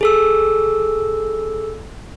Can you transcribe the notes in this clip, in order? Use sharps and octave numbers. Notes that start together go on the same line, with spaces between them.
G#4 A4 E6